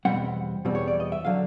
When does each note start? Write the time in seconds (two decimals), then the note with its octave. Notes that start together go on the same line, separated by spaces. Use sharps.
0.05 E2 B2 G3 C4 F#5
0.65 E2 B2 G3 C4
0.75 C#5
0.88 D5
1.00 D#5
1.12 E5
1.25 D3 F#3 F5